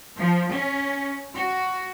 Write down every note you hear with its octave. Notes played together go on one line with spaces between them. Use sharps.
F3
C#4
F#4